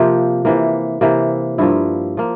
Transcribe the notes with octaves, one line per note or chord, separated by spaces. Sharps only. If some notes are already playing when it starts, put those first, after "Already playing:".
Already playing: C3 F3 A#3
C3 E3 A#3
C3 E3 A#3
G2 F3 A#3 E4
F3 A#3